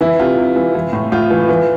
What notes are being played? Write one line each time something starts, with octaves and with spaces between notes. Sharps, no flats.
E3 E4
C3 F4
C3
E3
E3
A2
A2 F4
E3
E3